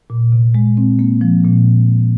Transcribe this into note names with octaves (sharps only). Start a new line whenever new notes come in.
A#2
C3
G#3
C4
A#3
F3
A#2